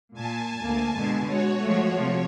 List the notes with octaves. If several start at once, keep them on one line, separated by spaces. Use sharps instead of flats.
A#2 G#5 A5
D2 A#3
B2 D3 G#3
G#3 F#4 C#5
F3 G#3 A3
C3 F3 A3 C#5